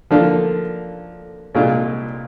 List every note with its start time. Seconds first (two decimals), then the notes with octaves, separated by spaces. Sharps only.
0.11 D3 F3 A#3 D4 F4
1.55 C2 A#2 G#3 D4 F4